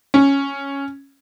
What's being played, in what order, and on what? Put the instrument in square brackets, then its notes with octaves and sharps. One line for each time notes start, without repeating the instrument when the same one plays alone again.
[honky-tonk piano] C#4